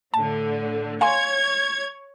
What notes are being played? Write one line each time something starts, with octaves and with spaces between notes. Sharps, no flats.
A2 D3 A5
C#5 F5 G#5 C6 G#6